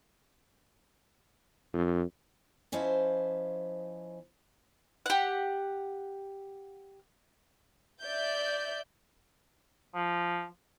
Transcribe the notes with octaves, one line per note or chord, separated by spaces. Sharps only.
F2
F3 C#4 E4 C5 D#5 F5
G4 F#5
D5 E5 G6
F3